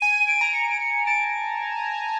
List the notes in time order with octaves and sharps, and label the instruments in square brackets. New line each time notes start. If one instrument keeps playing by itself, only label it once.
[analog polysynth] G#5 [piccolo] D#7
[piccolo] D7
[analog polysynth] A#5
[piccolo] C#7
D7
C#7
[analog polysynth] A5 [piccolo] D7